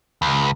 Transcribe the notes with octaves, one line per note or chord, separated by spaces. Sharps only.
C#2